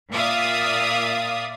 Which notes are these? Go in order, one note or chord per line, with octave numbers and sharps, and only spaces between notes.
A#2 D5 E5 F5 D#6